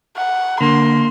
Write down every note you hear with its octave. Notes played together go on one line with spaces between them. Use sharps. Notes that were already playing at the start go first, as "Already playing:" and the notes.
F#5
D3 A#3 C6